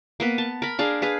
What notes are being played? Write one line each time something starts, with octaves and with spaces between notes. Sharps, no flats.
A#3 B3 B4
A5
A#4 B5
D4 G#4 F5
G#4 B4 F5